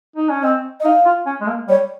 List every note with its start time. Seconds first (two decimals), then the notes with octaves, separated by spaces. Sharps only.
0.16 D#4
0.29 C#4
0.43 C4 D#5
0.80 D#5
0.84 D#4 F5
1.05 F4
1.26 C#4
1.41 G#3
1.47 A#3
1.68 G3 C#5